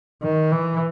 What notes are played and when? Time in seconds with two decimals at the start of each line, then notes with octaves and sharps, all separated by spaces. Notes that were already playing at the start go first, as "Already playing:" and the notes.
0.23 D#3
0.51 E3